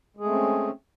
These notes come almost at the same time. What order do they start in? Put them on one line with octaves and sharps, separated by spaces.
G#3 G#4 A3 C4 C#4